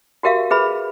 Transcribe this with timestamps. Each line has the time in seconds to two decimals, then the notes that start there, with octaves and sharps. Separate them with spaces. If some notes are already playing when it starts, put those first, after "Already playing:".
0.23 F#4 G4 A#4 E5 F5
0.51 G#4 B4 E5 B5